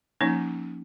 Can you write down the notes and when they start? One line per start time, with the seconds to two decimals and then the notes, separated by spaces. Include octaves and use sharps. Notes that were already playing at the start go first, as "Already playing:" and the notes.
0.21 F3 A#3 C#4 D#4